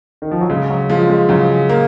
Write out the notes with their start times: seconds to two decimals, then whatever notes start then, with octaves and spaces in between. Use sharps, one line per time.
0.22 D#3
0.31 F3
0.41 F#3
0.50 C#3 G#3
0.70 F#3
0.90 F3 G#3
1.09 G#3
1.29 C#3 F#3
1.69 A#3